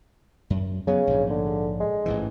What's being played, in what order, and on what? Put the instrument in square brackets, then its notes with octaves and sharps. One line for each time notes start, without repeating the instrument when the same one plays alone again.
[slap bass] F#2
[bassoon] C#3 [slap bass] F#3 B3
[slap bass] A#1 G#2
[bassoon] D3
G#3
[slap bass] A1 G#2 E3